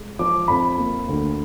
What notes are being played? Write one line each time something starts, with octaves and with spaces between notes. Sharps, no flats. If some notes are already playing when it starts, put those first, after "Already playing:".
Already playing: G#3
F3 D6
F2 B5
A#3
D2